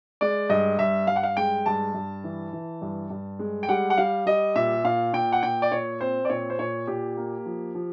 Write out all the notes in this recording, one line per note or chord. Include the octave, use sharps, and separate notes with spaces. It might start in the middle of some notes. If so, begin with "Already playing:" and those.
G#3 D5
G2 D#5
G2 E5
G2 F5
F#5
F5
G#3 G5
G2 A5
G2
E3
E3
G2
G2
G#3
G5
G3 F#5
F#5
G3 F5
G3 D#5
A#2 E5
A#2 F5
A#2 G5
F#5
A#2 G5
D5
A#2 C#5
C4 C5
D5
A#2 C#5
C5
A#2 C#5
A#2 G4
A#3
F3
F3